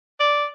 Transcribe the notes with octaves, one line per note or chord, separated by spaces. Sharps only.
D5